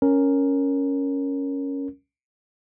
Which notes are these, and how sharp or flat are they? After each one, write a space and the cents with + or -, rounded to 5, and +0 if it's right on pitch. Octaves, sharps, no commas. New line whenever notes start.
C#4 +0 A#4 +0